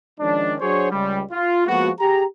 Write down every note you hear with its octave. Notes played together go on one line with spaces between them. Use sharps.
D#3 F3 G#3 C#4 D4
F#3 D4 F#4 G#4 C5 C#5
C#2 G3
F4
F3 G#3 A#3 B3 F#4
G4 G#4 A#5